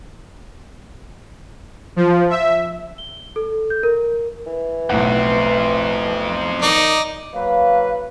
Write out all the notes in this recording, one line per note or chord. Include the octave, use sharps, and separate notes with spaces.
F3
E5
G7
A4
G6
A#4
E3
B1 F2 A2 C4 F#5
D#3 D#4 D5
F#3 A#3 B4 F5